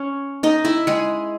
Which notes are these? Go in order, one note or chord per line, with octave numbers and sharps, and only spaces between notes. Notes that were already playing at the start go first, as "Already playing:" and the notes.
Already playing: C#4 C#5
D#4 D#5
E4 E5
G#3 G#4